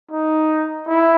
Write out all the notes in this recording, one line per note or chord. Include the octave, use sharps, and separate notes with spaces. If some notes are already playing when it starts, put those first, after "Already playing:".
D#4
E4